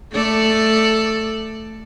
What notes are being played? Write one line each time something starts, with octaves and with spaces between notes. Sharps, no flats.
A3 A4 D5